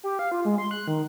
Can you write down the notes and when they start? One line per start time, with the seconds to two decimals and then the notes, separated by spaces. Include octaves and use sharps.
0.04 G4
0.19 F5
0.32 F4
0.45 G#3
0.58 C6
0.71 F#6
0.88 D#3